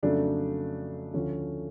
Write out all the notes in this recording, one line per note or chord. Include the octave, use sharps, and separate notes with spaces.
F2 C#3 F#3 A3 D4
D2 D3 F3 A3 C#4